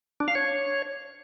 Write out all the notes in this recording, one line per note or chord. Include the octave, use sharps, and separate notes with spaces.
D4
F5
C#5